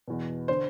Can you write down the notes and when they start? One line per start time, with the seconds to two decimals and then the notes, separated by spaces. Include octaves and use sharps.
0.08 E2 B2
0.48 D3 C5